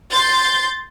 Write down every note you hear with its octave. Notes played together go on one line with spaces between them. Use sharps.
C6 G6 A6